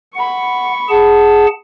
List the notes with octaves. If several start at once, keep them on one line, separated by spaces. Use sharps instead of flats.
F#5 B5 C#6
G#4 F#5 A5